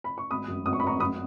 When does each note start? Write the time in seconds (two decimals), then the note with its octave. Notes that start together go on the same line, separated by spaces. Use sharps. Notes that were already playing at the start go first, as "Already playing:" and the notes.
0.04 B5
0.18 C#6
0.31 G#1 B5 D#6
0.48 F#2
0.66 G#1 D#6
0.73 C#6
0.80 B5
0.83 G#1 A#5 C#6
1.00 F#2 B5 D#6